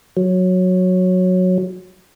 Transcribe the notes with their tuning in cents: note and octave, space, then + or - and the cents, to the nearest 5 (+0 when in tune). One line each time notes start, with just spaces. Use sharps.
F#3 -10